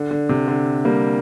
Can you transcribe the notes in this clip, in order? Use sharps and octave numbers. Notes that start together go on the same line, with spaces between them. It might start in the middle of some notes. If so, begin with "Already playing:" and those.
Already playing: D3
D3
C3
D3
G3 A#3